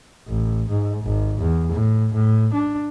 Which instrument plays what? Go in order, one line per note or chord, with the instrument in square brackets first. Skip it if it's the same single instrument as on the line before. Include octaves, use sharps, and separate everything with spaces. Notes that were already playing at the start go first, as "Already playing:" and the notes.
[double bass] A1
G#2
G#1
E2
A2
A2
D4